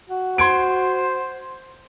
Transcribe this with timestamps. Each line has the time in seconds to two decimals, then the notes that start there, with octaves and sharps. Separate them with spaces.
0.10 F#4
0.38 C5 C6 G#6 D7